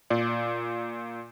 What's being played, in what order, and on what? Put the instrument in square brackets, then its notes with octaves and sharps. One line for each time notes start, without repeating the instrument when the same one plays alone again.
[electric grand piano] A#2 D5